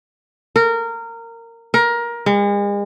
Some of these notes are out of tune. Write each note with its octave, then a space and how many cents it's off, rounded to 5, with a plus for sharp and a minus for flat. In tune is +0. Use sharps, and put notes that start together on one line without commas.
A#4 -20
A#4 +20
G#3 -40